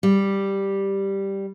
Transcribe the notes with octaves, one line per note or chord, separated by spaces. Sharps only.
G3